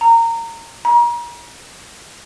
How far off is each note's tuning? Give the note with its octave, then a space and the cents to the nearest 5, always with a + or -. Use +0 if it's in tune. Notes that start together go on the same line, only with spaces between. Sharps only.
A#5 -20
A#5 +35